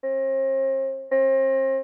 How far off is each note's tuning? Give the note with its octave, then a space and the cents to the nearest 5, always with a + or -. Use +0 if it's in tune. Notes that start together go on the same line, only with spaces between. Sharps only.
C4 +40
C4 +35